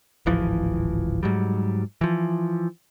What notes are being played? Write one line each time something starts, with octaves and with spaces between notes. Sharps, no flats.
D1 G#1 E3 F3
G#2 F#3 G3
E3 F3